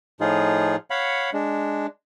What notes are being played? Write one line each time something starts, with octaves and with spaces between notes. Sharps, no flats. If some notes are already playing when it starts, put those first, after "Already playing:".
A2 F3 D#4 F4 G#4
C#5 F5 F#5 B5
G#3 D4